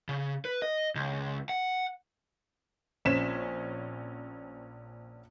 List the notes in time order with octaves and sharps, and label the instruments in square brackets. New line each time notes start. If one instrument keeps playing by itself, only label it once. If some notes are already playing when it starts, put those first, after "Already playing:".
[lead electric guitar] C#3
B4
D#5
C#2
F#5
[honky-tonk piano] A#1 C4 C#4 B6 E7